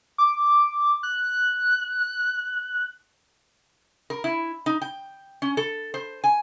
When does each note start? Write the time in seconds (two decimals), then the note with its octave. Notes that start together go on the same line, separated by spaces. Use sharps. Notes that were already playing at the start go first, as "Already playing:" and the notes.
0.18 D6
1.03 F#6
4.10 A#4
4.24 E4
4.66 D#4
4.82 G5
5.42 C#4
5.57 A4
5.94 C5
6.24 G#5